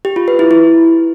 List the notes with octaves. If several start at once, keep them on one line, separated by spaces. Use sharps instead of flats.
G4
F4
B4
E4
E4